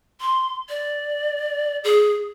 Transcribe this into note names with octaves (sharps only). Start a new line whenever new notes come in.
C6
D5
G#4